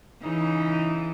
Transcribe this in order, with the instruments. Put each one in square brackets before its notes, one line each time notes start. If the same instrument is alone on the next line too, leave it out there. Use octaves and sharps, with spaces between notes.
[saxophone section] C#3 D#4 [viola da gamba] E3